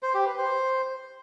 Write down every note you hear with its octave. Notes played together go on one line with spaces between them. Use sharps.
C5
G4
B4
C5